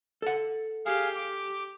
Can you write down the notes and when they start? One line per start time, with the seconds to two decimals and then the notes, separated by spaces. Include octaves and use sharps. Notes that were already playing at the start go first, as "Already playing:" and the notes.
0.22 A4 F#5
0.86 G4 G#4 F5
1.16 D6